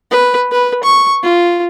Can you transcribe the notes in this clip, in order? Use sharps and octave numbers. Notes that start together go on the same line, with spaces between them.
B4
B4
C#6
F4